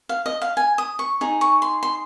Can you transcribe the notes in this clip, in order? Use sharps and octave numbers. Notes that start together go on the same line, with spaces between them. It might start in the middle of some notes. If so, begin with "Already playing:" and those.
F5
D#5
F5
G#5
D#6
C#6
D#4 G#4
C#6
C6
C6